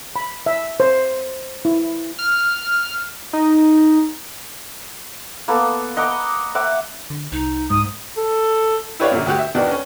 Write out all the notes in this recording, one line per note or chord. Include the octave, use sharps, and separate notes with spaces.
B5
E5
C5
E4
F6
D#4
A#3 B3 A4
D#5 F#5 A#5 D6
E5 F#5 D6
D3
C2 D#4
G#2 D#6
A4
E4 G4 B4 C#5 D5 F5
F#2 A#2 D3
D2 F#4 G4
E5
E2 B2 D#3 D4 F#4
C#4